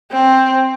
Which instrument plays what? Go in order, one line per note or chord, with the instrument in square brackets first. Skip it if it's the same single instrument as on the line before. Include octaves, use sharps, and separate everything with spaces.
[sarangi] C4